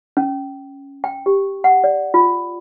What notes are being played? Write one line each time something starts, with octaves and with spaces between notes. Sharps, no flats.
C#4
G5
G4
F#5
D5
F4